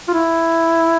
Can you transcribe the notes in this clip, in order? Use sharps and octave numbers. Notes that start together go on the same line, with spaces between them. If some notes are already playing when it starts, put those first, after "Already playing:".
F4
E4